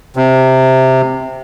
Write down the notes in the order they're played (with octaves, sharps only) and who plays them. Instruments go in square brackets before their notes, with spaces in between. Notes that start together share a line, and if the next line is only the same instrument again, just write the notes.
[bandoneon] C3